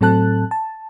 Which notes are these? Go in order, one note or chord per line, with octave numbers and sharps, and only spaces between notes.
A2 F#3 C4 A4 A5 F#6
A5